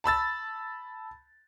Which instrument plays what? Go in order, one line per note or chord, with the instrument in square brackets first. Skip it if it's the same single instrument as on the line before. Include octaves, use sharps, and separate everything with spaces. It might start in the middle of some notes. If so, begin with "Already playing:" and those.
[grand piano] A5 B5 E6 A6